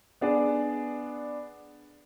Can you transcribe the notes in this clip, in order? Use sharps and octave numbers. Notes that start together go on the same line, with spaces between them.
B3 D4 G#4 D5